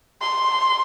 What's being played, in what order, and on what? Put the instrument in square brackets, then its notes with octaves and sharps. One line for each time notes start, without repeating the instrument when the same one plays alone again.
[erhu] C6